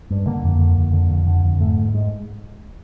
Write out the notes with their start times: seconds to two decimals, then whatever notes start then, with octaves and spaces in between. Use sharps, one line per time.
0.11 G2
0.27 D3 A#3
0.44 F2
0.61 D3
0.78 F2
0.93 D3
1.11 F2
1.27 D3
1.44 F2
1.60 G#2 A3
1.78 G#2
1.94 G#2 G#3